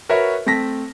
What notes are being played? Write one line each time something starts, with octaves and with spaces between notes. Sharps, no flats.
F#4 A#4 B4 C#5 E5
A3 C4 A5 A#6 B6